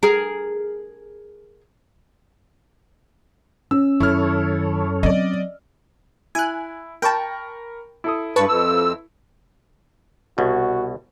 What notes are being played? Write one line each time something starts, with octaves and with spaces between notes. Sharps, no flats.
G#4 A#4
C#4 E6
F#2 D#3 E4 A4 C#5 F6
F#3 C4 D5 D#5
E4 G#5 F#6
A#4 G5 A5 B5 C#6
E4 A4 D#6
G2 B4 A5 C#6
F2 E6
C2 B2 F#4